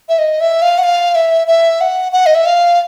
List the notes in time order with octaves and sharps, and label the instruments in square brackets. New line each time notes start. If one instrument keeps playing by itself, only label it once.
[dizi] E5
D#5
E5
F5
F#5
F5
E5
E5
F#5
F#5
D#5
E5
F5